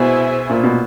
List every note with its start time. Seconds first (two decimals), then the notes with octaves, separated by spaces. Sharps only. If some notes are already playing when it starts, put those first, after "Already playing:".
Already playing: B2 E4 G#4 C5 E5 G#5
0.50 A#2
0.63 B2